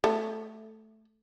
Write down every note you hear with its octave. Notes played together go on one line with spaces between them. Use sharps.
A3